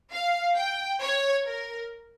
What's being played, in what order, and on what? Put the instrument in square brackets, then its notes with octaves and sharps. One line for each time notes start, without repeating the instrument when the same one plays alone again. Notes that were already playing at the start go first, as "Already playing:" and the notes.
[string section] F5
G5
C#5
A#4